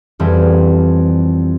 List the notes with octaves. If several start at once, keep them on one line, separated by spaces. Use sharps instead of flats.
F2 E3 G3